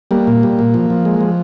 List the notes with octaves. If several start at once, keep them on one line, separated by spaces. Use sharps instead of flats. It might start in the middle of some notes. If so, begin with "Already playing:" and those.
G3 A#3
A#2
G3
A#2
F3
F3
G#3
F3